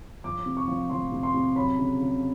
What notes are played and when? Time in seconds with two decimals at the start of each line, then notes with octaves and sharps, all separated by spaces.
0.24 F3 D6
0.46 C3
0.57 C#6
0.68 F3
0.90 F3 C6
1.12 C3
1.23 C6
1.34 C3
1.56 F#3 B5
1.78 C#3
2.00 C#3